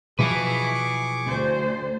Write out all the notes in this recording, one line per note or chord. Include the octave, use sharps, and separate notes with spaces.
B2 F3 F#3 E4 G#4 B4 C#6 D6
D2 C5